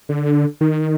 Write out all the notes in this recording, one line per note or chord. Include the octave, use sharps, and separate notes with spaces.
D3
D#3